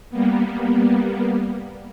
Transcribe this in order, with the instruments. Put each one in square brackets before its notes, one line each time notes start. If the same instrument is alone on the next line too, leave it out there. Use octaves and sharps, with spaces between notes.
[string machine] G3 A#3 B3